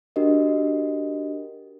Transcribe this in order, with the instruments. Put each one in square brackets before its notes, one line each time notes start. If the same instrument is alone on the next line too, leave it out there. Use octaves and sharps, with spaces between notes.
[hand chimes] D4 F#4 G4 A#4 D#5